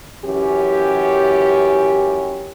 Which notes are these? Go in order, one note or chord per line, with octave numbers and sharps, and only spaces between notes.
F#2 E3 C#4 G4